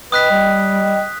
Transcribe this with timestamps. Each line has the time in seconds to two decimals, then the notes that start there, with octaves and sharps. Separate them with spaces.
0.12 B4 D#5 G5 D#6 F#6 B6
0.31 G3